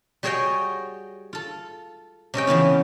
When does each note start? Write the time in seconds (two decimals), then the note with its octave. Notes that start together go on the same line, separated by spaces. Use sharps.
0.23 G3 F#4 G#4 C#5 D#5 G5
1.33 F4 A4
2.34 C3 C#4 D#5 G5
2.47 C#3 E3 B3 F4